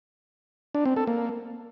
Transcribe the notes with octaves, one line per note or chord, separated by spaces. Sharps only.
D4
C4
A4
A#3